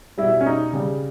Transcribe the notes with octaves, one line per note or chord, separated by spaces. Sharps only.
B2 G3 E4
C#4
D#4
C#3 G3